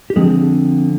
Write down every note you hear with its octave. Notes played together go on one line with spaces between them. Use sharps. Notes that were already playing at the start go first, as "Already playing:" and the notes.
G4
D3 F3 G#3 C4 G#4